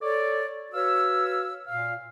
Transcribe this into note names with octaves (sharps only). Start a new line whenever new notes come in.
A4 C#5 D5
F#4 B4 C#5 F5 E6
A#2 F5